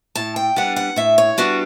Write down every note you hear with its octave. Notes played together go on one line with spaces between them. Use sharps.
A2 A5
G5
G3 B3 D4 F#5
F#5
A2 E5
C#5
G3 B3 D4 F#4